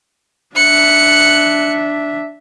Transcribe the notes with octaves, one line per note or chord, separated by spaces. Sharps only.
D4 E5 F#6 C#7